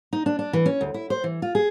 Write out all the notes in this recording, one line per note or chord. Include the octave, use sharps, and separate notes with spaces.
D#4
D4
D4
E3
C#4
D2
E4
C5
E3
F4
G#4